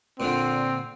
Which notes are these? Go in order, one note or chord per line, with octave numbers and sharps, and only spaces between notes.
A#2 D3 C4